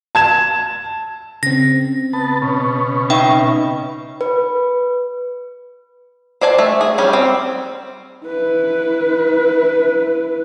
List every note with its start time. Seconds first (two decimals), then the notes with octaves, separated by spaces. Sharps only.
0.15 A5 G#6 E7
1.43 C#3 C4 A#6
2.13 B3 A5
2.42 B2 C#4
3.10 D#4 E5 G5
4.21 B4
6.41 C5 D5 G#5 A5
6.58 A3
6.81 G#4
6.98 G3 C#4
7.13 C4
8.26 E4 B4